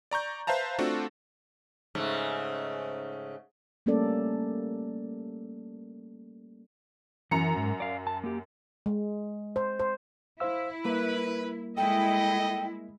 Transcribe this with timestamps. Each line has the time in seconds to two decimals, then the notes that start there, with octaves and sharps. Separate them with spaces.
0.11 D5 A#5 C#6 G6
0.47 B4 C5 E5 F5 A5 A#5
0.79 A3 C4 D4 F4 F#4 A4
1.95 G#2 C#3 A3
3.86 G3 A3 A#3 C#4 A4 D5
7.31 F#2 E3 A#5 C#7
7.56 G#2
7.80 D5 F5
8.07 A5
8.24 A#3 G4
8.86 G#3
9.56 C5
9.79 C5
10.40 E4 C5 F5 E6
10.85 G3 A#3 A#4 B4
11.77 G#3 E4 A4 D#5 G5